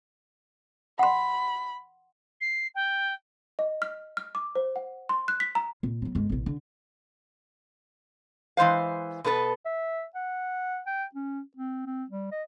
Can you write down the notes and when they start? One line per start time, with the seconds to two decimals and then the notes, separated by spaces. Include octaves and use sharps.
0.99 F#5 B5 C6
2.40 C7
2.74 G5
3.59 D#5
3.82 F6
4.17 F6
4.35 D6
4.55 C5
4.76 F#5
5.09 C6
5.28 F#6
5.40 B6
5.55 A#5
5.83 A#2
6.02 F#3 B3
6.15 G1 G#3
6.29 A1 B2
6.46 D3
8.57 E3 G#3 C5 F5
9.24 B2 B3 A4 B4
9.65 E5
10.15 F#5
10.87 G5
11.15 C#4
11.57 C4
11.86 C4
12.10 G3
12.32 D#5